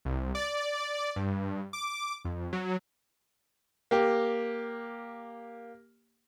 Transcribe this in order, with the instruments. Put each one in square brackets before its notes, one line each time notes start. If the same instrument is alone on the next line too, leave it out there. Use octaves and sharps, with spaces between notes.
[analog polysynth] C2
D5
G2
D6
F2
F#3
[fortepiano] A#3 G4